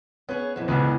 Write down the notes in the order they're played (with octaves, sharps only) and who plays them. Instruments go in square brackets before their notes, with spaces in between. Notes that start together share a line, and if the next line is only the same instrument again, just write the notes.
[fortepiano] B3 [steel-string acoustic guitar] C#4 G#4 C#5
[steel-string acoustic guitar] F2 B2 E3
[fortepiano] C#2 B2 [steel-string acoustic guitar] D3 E3 C#4